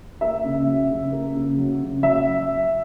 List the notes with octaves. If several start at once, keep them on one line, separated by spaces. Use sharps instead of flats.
A#3 E5
C#3
F#3
C#3
A#3
C#3
F#3
C#3
F#3 E5